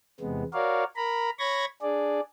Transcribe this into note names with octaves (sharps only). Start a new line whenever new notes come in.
E2 C3 G#3 B3
F#4 A#4 C#5 D5 F5
A#4 A#5 B5
C#5 B5 C#6 G#6 A#6
D4 G#4 D5